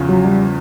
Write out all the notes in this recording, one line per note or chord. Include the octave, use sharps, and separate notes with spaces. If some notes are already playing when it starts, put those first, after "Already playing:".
Already playing: E2 C#3 F3
F#3
G3